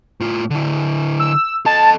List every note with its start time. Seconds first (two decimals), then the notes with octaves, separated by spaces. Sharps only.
0.21 A2 F4
0.50 D3 E4
1.20 E6
1.66 A4 D#5 A5